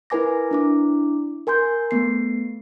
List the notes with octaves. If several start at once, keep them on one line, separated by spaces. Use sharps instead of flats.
E4 A#4 B4 G#5 D6 A#6
D4 E4 D6
A#4 G#5 C6 G6
A3 B3 C7